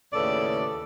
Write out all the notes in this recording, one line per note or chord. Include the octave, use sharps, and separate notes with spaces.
D#2 A2 C#3 A4 B4 D5